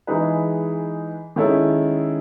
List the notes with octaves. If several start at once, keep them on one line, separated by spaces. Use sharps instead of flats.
E3 G#3 D#4 G#4 B4
D#3 G#3 C#4 E4 A4